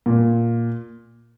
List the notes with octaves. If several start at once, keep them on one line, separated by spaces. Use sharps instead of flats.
A#2